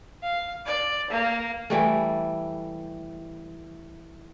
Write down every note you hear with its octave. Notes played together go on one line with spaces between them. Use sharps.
F5
D5
A#3
E3 G3 A3